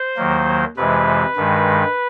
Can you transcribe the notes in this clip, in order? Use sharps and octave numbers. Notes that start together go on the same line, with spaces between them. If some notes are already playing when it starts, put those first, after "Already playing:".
Already playing: C5
D#2 D#3 F#3 A#3
F2 C3 E3 G#3 B4
G2 D#3 G#3